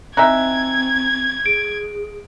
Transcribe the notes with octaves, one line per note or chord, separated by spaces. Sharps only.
C4 D#4 E4 E5 G#5 A#5 F#6 G#6
G#4 D7